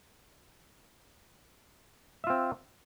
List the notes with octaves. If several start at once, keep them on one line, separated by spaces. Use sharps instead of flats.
C4 F4 E5